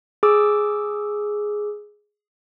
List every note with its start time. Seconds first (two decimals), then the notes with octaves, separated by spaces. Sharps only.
0.23 G#4 D6 E6